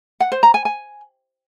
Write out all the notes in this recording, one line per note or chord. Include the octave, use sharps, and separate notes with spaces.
F#5
C5
A#5
G#5
G#5